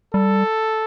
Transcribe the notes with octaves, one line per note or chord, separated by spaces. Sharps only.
G3 A4